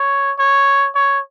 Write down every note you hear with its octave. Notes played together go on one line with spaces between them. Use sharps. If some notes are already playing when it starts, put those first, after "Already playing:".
Already playing: C#5
C#5
C#5